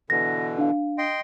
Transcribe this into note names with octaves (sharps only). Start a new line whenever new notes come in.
B2 D3 E3 A#6
D4 F5
D#5 G5 C6